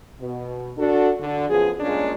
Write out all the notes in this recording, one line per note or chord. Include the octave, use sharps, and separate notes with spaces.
B2
D4 F#4 A4
D3
F#2 F3 B3 G#4
G2 A#2 G#3 A#3 C#4 D4